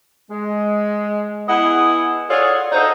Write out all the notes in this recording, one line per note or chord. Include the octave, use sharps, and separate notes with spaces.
G#3
B3 E4 G#4 D#5 F#5
F4 F#4 G#4 A4 C#5 D5
D#4 F#4 G#4 A4 C5 D#5